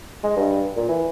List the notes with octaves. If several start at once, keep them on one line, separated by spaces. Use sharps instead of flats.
G#3
G2
A#2
E3